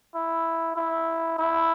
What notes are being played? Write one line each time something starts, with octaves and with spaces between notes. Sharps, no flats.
E4
E4
E4